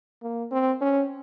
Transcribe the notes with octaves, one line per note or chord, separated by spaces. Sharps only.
A#3
C4
C#4